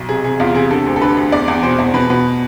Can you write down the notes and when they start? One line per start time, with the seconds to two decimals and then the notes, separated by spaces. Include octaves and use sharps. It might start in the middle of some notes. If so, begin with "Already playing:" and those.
Already playing: B1
0.09 C3 G#4
0.24 C3 G#4
0.40 E2 F4
0.55 C3 G#4
0.70 D3 A4
0.86 D2
0.96 A4
1.01 D3 B4
1.17 D2
1.32 E2 D5
1.48 E2
1.63 B2 C5
1.79 E2
1.94 B2 B4
2.10 B2 B4